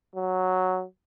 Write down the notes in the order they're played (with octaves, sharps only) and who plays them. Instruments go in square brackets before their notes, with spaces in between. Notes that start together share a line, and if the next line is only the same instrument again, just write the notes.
[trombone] F#3